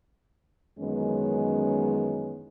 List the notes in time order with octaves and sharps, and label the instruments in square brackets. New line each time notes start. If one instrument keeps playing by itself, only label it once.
[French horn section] F#2 D#3 E3 G#3 B3 C#4